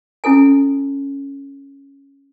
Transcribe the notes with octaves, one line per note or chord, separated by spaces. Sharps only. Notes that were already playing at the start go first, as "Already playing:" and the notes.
C#4 E4 A4 G#5